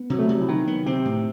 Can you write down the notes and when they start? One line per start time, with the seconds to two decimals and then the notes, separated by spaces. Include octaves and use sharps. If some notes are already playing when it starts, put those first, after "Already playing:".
Already playing: B3
0.10 C3 F#3
0.19 A3
0.26 G3
0.29 C3
0.34 F#3
0.41 E3
0.48 D#3 F#3
0.67 B3
0.86 C3 C4
1.05 A2